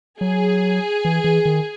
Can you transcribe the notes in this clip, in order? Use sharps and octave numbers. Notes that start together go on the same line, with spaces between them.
F#3 G#4
E3
E3
D#3